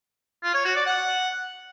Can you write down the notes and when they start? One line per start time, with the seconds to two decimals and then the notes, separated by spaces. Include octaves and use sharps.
0.43 F4
0.54 C#5
0.65 F#4
0.75 D5
0.86 F#5